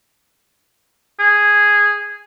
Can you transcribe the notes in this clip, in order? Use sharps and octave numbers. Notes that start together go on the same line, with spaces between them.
G#4